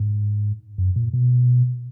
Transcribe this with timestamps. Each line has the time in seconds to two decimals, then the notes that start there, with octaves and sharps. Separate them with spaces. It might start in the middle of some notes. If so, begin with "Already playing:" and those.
Already playing: G#2
0.78 F#2
0.96 A#2
1.13 B2